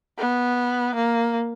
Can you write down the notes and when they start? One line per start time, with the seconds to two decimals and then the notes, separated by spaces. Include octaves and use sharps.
0.18 B3
0.95 A#3